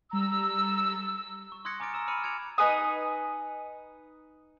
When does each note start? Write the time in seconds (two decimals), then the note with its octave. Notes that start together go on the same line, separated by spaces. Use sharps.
0.11 G3 A#5 E6
1.52 C#6
1.65 C6 D#6 F#6 G#6 A#6 C#7
1.80 G#5 A#5 D6 F6 A6 D7
1.94 A#5 E6 E7
2.08 B5 D6 F6 C#7 D#7
2.24 G#6 C#7 D7 F7
2.58 D#4 B4 G#5 D#6